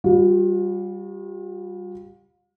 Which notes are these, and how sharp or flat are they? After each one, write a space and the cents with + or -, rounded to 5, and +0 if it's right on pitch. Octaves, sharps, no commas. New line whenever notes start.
G3 +0 F4 +40